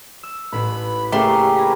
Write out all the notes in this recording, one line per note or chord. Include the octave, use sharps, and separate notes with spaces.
E6
A1 A2 B4 B5
C#3 A3 A#3 G4 C6
G#5 A#5 B5